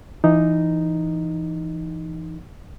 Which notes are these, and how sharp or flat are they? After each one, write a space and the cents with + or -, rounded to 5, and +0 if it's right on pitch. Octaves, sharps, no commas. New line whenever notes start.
E3 +20 D#4 +0